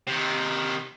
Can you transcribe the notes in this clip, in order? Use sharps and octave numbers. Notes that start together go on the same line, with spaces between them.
C3 D#3